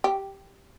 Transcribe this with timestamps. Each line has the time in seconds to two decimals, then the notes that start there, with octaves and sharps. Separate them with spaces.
0.04 G4